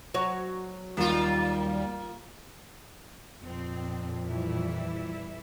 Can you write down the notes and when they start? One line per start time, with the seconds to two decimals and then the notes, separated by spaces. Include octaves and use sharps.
0.14 F#3 F#4 C#5
0.97 D#2 G3 A#3 D#4 F4
3.43 F2 A#2 C4
4.28 E3 G3 E4